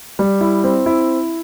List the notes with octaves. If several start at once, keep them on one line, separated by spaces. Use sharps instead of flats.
G3
E4
C4
E4